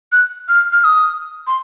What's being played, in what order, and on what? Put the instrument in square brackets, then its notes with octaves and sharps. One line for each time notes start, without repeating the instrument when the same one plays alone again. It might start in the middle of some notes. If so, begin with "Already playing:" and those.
[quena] F#6
F6
F6
D#6
C6